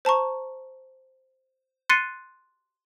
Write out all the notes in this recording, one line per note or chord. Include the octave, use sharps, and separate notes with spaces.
C5 A5 A#5 C#6
C6 F#6 A6 C7 C#7 D#7